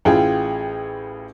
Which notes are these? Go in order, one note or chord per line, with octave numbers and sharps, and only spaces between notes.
A1 E4 F4 G#4 G5